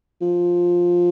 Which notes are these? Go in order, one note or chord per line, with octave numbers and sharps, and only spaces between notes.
F3